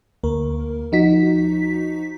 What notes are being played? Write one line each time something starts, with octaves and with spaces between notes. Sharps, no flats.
D2 A#3 A#4
F3 D#4 F#4 B6